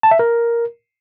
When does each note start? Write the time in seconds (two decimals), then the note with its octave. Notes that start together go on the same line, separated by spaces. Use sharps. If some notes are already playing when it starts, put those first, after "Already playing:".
0.03 A5
0.11 E5
0.19 A#4